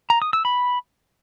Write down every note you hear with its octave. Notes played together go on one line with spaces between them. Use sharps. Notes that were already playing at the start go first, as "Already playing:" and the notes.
A#5
D#6
E6
B5